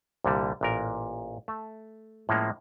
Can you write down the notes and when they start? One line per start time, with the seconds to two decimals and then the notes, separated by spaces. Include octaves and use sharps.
0.24 C2 A#2 D3 G3
0.61 A1 A#2 A#4
1.48 A3
2.29 A2 F3 G#3 A#3 C#4